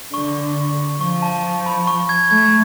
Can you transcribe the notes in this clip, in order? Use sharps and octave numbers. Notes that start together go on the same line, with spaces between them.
D3 C#6
F3 C#6
A5
B5
C#6
G#6
A3 G#6